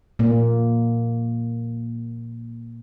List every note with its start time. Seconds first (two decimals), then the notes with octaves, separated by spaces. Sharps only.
0.19 A#2 A#3